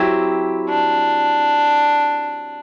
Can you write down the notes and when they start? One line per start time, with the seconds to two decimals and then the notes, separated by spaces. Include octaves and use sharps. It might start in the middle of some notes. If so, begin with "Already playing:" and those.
Already playing: F#3 C4 E4 G4
0.68 D4